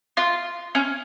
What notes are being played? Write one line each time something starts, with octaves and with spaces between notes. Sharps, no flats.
F4
C#4